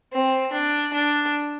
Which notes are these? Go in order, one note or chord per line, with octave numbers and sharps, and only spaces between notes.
C4
D4
D4